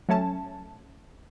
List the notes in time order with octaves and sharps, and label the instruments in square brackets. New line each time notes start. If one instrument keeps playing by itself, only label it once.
[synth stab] F#3 A3 C#4 A5